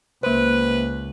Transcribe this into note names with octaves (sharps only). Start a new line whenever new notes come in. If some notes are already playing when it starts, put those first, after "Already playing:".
C#2 A#3 B4 C5